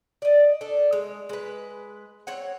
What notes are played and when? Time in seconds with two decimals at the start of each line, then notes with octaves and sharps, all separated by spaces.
0.22 D5 D#5
0.61 D4 A4
0.93 G#3
1.29 G#3 B4
2.27 C4 C#5 F#5